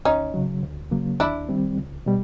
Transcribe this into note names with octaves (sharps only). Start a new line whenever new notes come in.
D2 C#4 D#4
C#3 F#3
D2
C#3 F#3 A#3
D#2 D4 E4
D#3 G3 C4
C#2
B2 G3